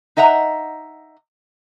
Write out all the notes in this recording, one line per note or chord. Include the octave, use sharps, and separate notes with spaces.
D#4 D#5 E5 F#5 A#5